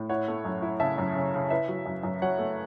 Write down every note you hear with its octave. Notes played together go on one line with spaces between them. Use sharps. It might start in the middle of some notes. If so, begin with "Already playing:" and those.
Already playing: A2
E4 C#5 F#5
A3
F#2
E4
C#3 E5 A5
F#2
C#3
C#3
E4 B4 E5
F#3
F#2
F#2
F#3 C#5 F#5
A3